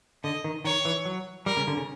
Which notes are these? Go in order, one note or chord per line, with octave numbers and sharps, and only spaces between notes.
D3 D#5
D#3
D#3 C#5
E3
F#3
G3 A#4
C#3
D3
C#3